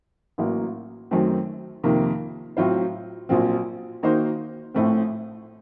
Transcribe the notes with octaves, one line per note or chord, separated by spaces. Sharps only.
A1 A2 F#3 A#3
F#2 D#3 F#3 A3 C4
F2 C3 D#3 A#3
A2 F#3 C4 F4 C5
A#1 A#2 F#3 C4
D#3 A#3 D#4 F#4 C5
A#1 A2 A3 C4